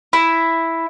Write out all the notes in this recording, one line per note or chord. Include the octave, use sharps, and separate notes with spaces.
E4